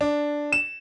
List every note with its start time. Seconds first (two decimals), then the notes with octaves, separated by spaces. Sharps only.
0.01 D4
0.52 E7